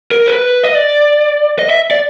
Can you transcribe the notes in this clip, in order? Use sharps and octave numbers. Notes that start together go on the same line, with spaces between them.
A#4
C5
B4
D#5
D5
D#5
E5
D5